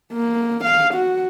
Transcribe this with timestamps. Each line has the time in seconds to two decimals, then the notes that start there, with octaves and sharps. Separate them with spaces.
0.13 A#3
0.64 F5
0.94 F#4